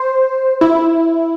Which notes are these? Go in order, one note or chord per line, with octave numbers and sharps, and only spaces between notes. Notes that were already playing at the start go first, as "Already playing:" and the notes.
Already playing: C5
E4